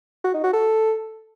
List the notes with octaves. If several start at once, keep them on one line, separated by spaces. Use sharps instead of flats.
F#4
D#4
F#4
A4